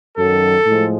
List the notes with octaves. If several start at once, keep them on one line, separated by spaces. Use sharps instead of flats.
F#2 D#3 F#3 A4
A2 F3 G#3